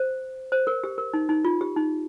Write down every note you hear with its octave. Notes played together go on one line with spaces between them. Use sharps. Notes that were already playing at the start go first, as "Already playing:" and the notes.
Already playing: C5
C5
A#4
G4
A#4
D#4
D#4
F4
G4
D#4